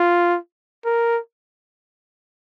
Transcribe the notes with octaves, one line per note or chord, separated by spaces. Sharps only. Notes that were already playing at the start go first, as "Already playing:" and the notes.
Already playing: F4
A#4